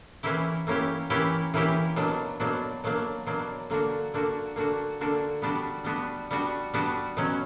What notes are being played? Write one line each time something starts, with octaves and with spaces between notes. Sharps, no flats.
E3 A#3 C#4 E4 G4
E3 A#3 C#4 E4 G4
E3 A#3 C#4 E4 G4
E3 A#3 C#4 E4 G4
B2 F#3 A#3 D4
B2 F#3 A#3 D4
B2 F#3 A#3 D4
B2 F#3 A#3 D4
D3 A#3 D4 F#4
D3 A#3 D4 F#4
D3 A#3 D4 F#4
D3 A#3 D4 F#4
G3 B3 D4 F#4
G3 B3 D4 F#4
G3 B3 D4 F#4
G3 B3 D4 F#4
B2 F#3 C#4